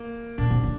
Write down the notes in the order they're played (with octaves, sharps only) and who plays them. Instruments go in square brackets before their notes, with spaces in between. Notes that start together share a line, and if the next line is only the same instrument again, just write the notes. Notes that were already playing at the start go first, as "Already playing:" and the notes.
Already playing: [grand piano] A#3
[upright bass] A#2 [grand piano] D4
[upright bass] C3
D3